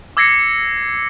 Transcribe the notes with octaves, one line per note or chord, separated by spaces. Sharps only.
D6 E6 G#6 A#6 C7 C#7